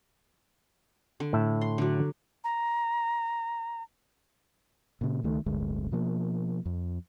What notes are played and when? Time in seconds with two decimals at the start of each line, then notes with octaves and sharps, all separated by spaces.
1.20 D3
1.33 A2 E5
1.61 C6
1.78 D3 F#3
2.44 A#5
5.01 A#2 C#3
5.24 C#2 D#3 A3
5.46 D1 G1 D2 G#3
5.91 B2 F3 A#3
6.66 F2